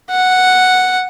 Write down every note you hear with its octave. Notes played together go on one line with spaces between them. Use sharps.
F#5